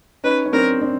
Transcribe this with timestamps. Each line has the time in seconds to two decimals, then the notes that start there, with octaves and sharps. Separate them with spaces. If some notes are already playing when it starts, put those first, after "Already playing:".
0.24 C#4 D#4 B4
0.46 C#4
0.52 C4 D4 A#4
0.81 C4 D4